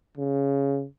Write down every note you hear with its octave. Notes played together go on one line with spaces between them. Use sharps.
C#3